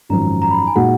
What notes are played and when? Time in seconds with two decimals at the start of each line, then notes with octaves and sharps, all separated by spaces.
0.09 G#1 F#2 F3 A#5
0.42 A#5
0.51 B5
0.59 A#5
0.67 G#5
0.75 A#2 G#3 D#4 F#4 F#5